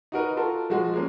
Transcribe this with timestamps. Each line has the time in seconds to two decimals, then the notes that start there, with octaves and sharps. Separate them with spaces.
0.12 D#4 F#4 A#4 B4
0.37 F4 F#4 A4 A#4
0.70 F3 G#3 F#4
0.94 G#3 A#3 C#4